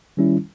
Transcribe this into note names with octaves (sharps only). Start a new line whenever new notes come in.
D#3 G3 C#4 E4